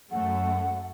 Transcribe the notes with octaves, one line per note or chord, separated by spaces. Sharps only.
F#2 A3 F#5